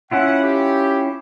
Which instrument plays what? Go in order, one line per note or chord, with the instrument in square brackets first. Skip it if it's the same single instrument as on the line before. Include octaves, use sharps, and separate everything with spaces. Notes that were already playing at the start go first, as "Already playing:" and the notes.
[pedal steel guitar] C#4 E4 F4 [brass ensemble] F#5
[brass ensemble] G4